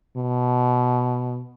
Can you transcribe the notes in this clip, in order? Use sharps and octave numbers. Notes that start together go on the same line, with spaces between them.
B2